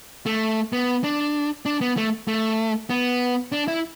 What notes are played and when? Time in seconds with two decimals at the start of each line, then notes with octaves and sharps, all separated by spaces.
0.26 A3
0.73 B3
1.04 D4
1.66 D4
1.81 B3
1.97 A3
2.28 A3
2.90 B3
3.52 D4
3.68 E4